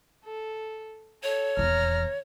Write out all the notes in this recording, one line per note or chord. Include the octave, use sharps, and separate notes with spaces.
A4
A4 C#5
D#1 E2 A#5 F6